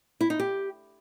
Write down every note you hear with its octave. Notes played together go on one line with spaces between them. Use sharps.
E4
D#4
G4